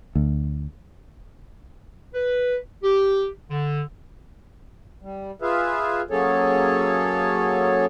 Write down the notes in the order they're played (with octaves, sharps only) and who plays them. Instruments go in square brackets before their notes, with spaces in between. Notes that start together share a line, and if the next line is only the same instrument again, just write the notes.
[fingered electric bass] D2
[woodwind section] B4
G4
D3
[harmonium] G3
F4 G#4 B4 E5 F5
F#3 A#3 C#4 G#4 A4 C#5